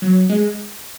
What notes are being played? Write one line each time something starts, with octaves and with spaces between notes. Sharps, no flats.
F#3
G#3